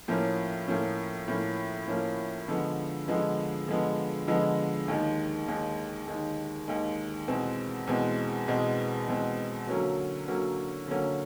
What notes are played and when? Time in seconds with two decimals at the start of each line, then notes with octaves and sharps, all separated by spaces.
0.08 A2 F3 A#3 C#4
0.68 A2 F3 A#3 C#4
1.28 A2 F3 A#3 C#4
1.87 A2 F3 A#3 C#4
2.48 D3 F3 G#3 B3
3.08 D3 F3 G#3 B3
3.68 D3 F3 G#3 B3
4.27 D3 F3 G#3 B3
4.88 D#2 D#3 G#3
5.48 D#2 D#3 G#3
6.08 D#2 D#3 G#3
6.68 D#2 D#3 G#3
7.28 E2 B2 G#3 C4
7.87 E2 B2 G#3 C4
8.48 E2 B2 G#3 C4
9.08 E2 B2 G#3 C4
9.67 D3 F#3 A#3 C#4 F#4
10.28 D3 F#3 A#3 C#4 F#4
10.87 D3 F#3 A#3 C#4 F#4